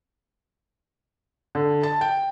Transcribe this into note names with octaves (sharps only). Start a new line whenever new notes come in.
D3
A5
G5